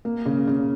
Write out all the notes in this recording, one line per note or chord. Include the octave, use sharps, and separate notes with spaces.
A#3
C#3
C#3